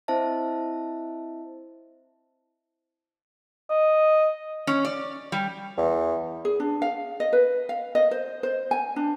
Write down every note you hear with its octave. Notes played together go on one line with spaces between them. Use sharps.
C4 E4 C5 D#5 E5 A5
D#5
C#4
D5
G3
E2
G#4
D4
F5
D#5
B4
F5
D#5
C5
C5
G#5
D4